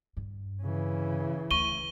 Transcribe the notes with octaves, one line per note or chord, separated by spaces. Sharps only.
G2
C#3 E3
D2 C#6 D#7 G7